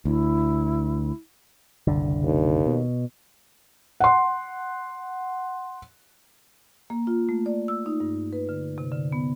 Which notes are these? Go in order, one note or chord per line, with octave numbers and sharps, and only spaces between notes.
D2 E4
F#1 C2 D3
D#2
B2
F#5 C6
A#3
F4
A3
D5
E6
D#4
G2
B4
D3
C3
D3
B3